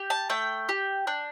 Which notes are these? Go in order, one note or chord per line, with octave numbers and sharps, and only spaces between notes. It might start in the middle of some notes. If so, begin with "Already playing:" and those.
Already playing: G4
A5
A3 G5
G4
D4